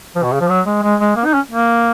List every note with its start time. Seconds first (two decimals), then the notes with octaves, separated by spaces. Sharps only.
0.16 F3
0.23 B2
0.33 C#3
0.41 F3
0.49 F#3
0.66 G#3
0.83 G#3
1.01 G#3
1.16 A#3
1.25 D#4
1.34 C#4
1.52 A#3